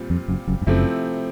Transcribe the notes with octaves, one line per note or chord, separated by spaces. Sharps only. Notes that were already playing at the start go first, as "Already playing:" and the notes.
Already playing: A#2 G3 C4 F4
F2
F#1 F#2
F#1 F#2
G2
F#1 F#2 C3 F3 A3 C4 E4